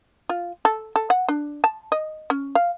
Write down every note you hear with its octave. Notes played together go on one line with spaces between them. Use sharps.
F4
A4
A4
F#5
D4
A5
D#5
C#4
F5